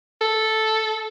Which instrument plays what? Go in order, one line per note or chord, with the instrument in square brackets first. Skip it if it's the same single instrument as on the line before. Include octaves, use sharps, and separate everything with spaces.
[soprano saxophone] A4